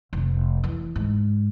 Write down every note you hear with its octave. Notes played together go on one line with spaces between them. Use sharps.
F1
E3
G#2